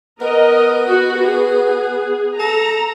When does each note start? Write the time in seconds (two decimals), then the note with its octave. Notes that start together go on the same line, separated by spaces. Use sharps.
0.21 B3 A#4 D#5
0.89 F#4
1.27 G#4
2.39 A4 A#5